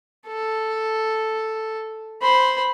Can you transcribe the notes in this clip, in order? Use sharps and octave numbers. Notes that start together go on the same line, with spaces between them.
A4
C5 B5